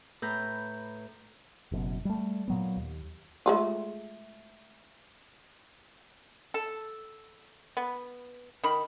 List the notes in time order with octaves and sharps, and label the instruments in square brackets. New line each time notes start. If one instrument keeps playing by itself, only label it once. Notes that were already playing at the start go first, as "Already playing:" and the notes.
[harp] A2 B4 A#5 G6
[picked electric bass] F#1 F#2 B2
G3 A3
A#2 F#3 B3
D#2
[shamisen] G#3 A3 F4
[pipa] A4
B3
D#3 B5